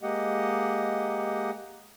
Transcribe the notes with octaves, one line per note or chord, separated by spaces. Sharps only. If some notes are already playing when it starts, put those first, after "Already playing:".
G#3 A#3 G4 D#5 F#5